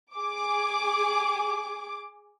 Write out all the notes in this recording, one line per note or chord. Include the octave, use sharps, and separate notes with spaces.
G#4 D6